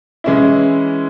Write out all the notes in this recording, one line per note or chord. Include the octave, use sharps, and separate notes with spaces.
E3 G#3 C#4 E4